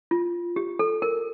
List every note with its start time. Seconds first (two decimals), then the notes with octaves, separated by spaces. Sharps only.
0.11 F4
0.56 G4
0.79 A4
1.02 A#4